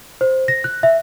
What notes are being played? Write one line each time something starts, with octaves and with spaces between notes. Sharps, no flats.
C5
A#6
F#6
E5